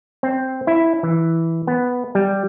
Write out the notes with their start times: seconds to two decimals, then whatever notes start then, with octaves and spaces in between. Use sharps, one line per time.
0.23 C4
0.67 E4
1.03 E3
1.67 B3
2.15 G3